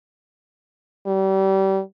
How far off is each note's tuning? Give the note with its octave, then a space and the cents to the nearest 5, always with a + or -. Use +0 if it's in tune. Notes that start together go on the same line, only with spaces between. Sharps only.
G3 -30